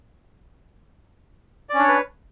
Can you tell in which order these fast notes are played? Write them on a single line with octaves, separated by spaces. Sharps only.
D5 C#4 D4 C#5 B4